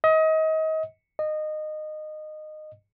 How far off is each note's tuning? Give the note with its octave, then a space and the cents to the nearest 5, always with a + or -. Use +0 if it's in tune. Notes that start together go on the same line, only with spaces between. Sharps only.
D#5 +30
D#5 -20